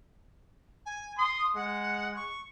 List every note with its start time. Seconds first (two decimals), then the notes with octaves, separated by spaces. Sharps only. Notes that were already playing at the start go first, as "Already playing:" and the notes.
0.85 G#5
1.17 C6 D#6
1.55 G#3 F#5
2.15 C#6